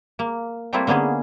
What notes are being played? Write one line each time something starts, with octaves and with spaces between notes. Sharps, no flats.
A#3
G3 A3 A#3 C4 E4 F4
D3 A#3 B3 C#4 G#4